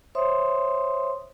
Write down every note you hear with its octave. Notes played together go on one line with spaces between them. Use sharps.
C5 C#5 E5 C6 D#6